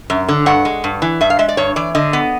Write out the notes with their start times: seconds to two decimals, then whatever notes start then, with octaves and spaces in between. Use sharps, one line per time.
0.10 F#2
0.29 D3
0.46 G2 F#5
0.65 G#3
0.84 G2
1.02 E3
1.21 G2 E5
1.30 F5
1.39 G#3 E5
1.49 D5
1.57 G2 C#5
1.76 E3 D5
1.95 D3 D#5
2.13 B3